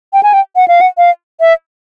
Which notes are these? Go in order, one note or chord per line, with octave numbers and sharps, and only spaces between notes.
G5
G#5
G5
F#5
F5
F#5
F5
E5